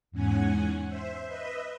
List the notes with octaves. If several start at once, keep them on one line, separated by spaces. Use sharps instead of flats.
E2 G#2 C#4 F#5 G#5
C5 E5
B4 D#5 E5